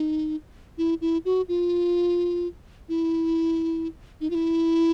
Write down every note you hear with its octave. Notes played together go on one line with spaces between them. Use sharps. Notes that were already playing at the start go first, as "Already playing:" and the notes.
Already playing: D#4
E4
E4
F#4
F4
E4
D#4
F4
E4